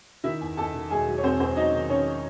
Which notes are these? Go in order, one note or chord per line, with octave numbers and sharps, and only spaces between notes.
D#3 E4 E5
E2
E2 A4 A5
D#3
E1 G#4 G#5
F#3
C#5
E1 C4 C5
E2 C4 C5
F#3 D#4 D#5
D#3
D#3 C#4 C#5